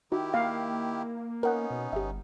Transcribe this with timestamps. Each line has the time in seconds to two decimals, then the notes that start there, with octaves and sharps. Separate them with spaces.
0.12 D#3 D#4 E4 F#4 G4
0.34 A#3 F5
1.43 B3 C#4 D#4 A#4 F#5 F#6
1.71 B2
1.93 G1 G4 E5